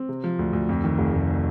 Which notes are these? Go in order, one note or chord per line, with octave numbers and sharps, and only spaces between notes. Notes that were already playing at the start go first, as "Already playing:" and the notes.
Already playing: C4
C3
F3
D2
D2
F2
D#3
F1
F1